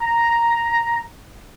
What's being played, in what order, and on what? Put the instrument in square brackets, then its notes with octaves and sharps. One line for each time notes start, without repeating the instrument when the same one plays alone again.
[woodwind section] A#5